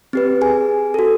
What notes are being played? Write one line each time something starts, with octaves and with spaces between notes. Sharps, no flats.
C4 G4 B4
G#4 G#5
F#4 A4